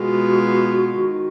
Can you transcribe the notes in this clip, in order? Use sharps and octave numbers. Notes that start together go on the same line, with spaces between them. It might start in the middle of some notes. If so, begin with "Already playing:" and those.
Already playing: B2 G#3 B3 F4 F#4
D#3